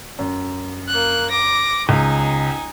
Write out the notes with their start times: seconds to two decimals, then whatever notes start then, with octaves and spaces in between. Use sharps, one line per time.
0.19 F#2
0.88 A#3 F#6
1.30 D6 A#6
1.89 C#2 D#4 G#5